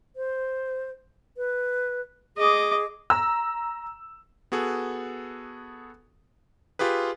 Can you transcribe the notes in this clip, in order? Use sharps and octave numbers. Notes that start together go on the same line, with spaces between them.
C5
B4
G#4 D#5 D6
A#5 E6
B3 F#4 G#4 A4
F4 G4 G#4 B4